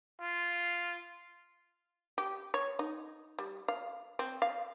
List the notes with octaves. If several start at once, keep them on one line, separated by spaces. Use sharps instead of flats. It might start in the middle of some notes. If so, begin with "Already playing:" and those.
F4
G4
C#5
D#4
G3
F5
C4
F5